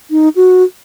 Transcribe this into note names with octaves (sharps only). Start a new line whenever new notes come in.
D#4
F#4